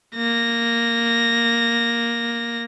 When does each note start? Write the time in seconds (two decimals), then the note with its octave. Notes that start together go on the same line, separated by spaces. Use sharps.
0.15 A#3 A#6